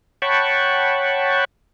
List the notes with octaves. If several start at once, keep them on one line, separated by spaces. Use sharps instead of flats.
C#5 F#5 G5 A5 B5 C#6